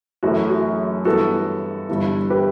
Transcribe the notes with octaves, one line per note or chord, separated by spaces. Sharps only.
F#1 F#2 E3 A3 F#4
F#4
G2 E3 B3 F#4 A4
G1 G2 E3
G4 B4